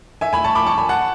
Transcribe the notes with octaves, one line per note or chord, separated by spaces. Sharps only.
E5 G#5
G#5 B5
A5 C#6
B5 D6
A5 C#6
G#5 B5
F#5 A5